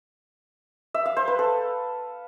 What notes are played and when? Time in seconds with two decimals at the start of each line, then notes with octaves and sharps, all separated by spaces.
0.94 E5
1.06 F5
1.17 C5
1.28 B4
1.39 A4